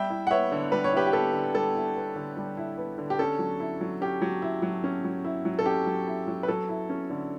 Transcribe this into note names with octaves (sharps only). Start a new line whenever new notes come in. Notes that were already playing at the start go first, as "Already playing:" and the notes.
Already playing: G3 E5 G5
E4
F#5
B3 C#5 E5
D3
G3 B4
C#5
E4 G4 B4
G4
B3 A4
D3
G3 A4
E4
B3
D3
G3
E4
B3
D3
G4
C#4 A4
F#3
E4
F#3
C#4 G4
F#3
E4
F#3
C#4
F#3
E4
F#3
A4
C#4 G4
F#3
E4
F#3
B4
F#3 A4
E4
C#4
D3